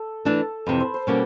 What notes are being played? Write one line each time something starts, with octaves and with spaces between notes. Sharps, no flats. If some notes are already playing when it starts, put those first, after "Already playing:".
Already playing: A4
E3 A3 D4 A4
F2 C3 E3 B4
C5
C5
B2 G3 A#3 C#4 F#4 C#5